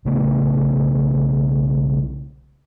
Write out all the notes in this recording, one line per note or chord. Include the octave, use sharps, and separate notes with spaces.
B1 C#3 A3 B3